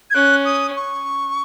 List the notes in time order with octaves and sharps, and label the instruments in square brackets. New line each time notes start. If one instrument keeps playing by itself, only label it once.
[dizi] G#6
[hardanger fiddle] C#4 [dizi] F#6
[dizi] D#6
C#6